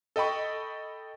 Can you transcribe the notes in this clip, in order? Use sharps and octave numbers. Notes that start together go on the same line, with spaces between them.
A4 D#5 G5 B5 C#6